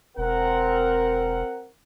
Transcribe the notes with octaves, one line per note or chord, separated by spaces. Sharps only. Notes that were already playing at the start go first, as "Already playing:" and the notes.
E1 C4 A#4 F#5